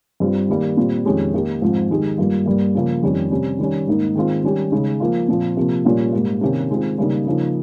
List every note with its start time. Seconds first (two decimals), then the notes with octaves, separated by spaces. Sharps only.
0.20 G2 G3 C4 F4
0.49 D#3 G3 A#3
0.77 A#2 G3 C4 F4
1.05 F2 D#3 G#3 C#4 G4
1.33 D#3 A#3 D#4 G4
1.62 G#2 F3 C4 F4
1.91 D#3 G#3 D#4 G4
2.18 G2 G3 A#3 F4
2.46 G2 G3 A#3
2.75 C#3 F3 A#3
3.02 F2 D#3 G3 C#4 G4
3.31 C3 G3 C#4
3.59 D#3 G3 C#4
3.87 G#2 D#3 A#3 D#4
4.16 D#3 G#3 C4 F4
4.44 D#3 G3 C#4 G4
4.71 C#3 G#3 D#4
5.00 F3 A#3 F4
5.28 A#2 F3 C4 F4
5.56 C3 F3 A#3
5.85 A#2 G3 A#3 C#4
6.13 G#2 G3 A#3
6.41 C3 D#3 A#3 C#4 G4
6.70 D#3 G#3 C4 F4
6.98 C#3 G3 A#3 D#4
7.27 C#3 F3 A#3 D#4